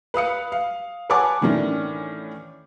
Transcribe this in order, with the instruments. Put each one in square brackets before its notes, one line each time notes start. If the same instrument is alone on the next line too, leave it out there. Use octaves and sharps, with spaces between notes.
[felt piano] B4 F5 D#6 C#7
F5
B4 C#5 F#5 G#5 A5 D6
A2 D#3 E3 C#4 D4